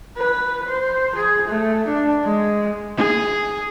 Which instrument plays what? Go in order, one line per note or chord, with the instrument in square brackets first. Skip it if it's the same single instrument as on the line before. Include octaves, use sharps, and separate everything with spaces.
[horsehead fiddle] B4
C5
G#4
A3
D4
G#3
G#4